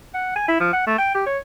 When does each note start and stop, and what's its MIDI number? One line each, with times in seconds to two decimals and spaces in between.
0.14 0.32 78
0.36 0.44 80
0.48 0.56 64
0.60 0.72 53
0.73 0.84 78
0.87 0.95 57
0.98 1.10 79
1.15 1.24 67
1.26 1.38 73